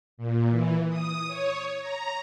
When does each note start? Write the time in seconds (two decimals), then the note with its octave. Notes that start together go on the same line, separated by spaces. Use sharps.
0.17 A#2
0.49 E3
0.89 D#6
1.28 C#5
1.80 A#5